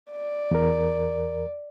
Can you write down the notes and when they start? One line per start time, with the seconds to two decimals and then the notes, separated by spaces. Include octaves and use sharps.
0.12 D5
0.51 E2 A#4